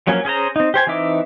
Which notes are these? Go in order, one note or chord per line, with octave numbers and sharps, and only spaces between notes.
F3 F#3 A#3 C#4
C#4 G#4 C5 A#5
C4 D#4
G4 C5 G#5
E3 C4 D#4 E5 D6